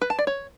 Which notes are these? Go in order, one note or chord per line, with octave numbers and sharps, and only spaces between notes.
B4
A5
D5
C#5